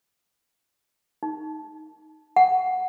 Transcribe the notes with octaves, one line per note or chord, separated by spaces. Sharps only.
D#4
F#5